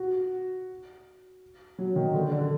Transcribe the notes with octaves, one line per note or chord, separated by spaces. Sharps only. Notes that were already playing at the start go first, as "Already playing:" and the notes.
Already playing: F#4
F#3
D#3
D3
D3